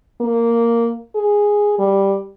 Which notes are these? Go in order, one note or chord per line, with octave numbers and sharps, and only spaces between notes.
A#3
G#4
G3